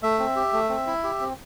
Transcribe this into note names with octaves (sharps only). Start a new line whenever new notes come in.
A3 E5
C4
G4
A3
C4
E4
G4
C4